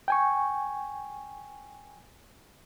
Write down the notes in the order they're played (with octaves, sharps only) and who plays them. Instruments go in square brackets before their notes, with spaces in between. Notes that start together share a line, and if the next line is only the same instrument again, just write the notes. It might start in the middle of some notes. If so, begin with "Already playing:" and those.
[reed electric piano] G5 G#5 C#6